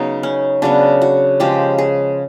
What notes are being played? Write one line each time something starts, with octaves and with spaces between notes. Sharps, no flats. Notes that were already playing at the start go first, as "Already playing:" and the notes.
Already playing: C#3 F#3 B3 D#4
C#4
C#3 F#3 B3 D4
F#4
C#3 F3 G#3 G4
G#4